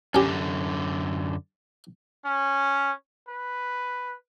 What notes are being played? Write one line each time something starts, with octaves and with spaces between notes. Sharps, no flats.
F#2 D3 C#4 G4
C#4
B4